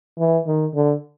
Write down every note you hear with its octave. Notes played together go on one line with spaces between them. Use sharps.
E3
D#3
D3